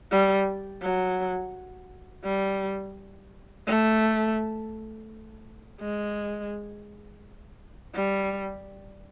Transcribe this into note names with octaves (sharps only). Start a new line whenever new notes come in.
G3
F#3
G3
A3
G#3
G3